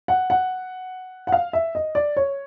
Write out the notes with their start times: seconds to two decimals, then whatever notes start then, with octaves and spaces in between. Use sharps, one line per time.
0.08 F#5
0.30 F#5
1.27 F#5
1.32 F5
1.53 E5
1.75 D#5
1.95 D5
2.17 C#5